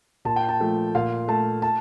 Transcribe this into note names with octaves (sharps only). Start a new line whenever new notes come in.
A#2 A5
G5
A5
F3 A3
A#2 F5
A3 A5
A5